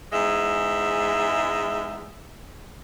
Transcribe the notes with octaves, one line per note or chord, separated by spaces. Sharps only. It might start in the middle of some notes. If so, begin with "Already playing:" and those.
E2 G#2 G#3 E5